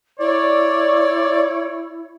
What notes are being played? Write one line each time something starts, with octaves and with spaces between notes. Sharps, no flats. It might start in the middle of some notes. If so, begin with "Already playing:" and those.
E4 C#5 D5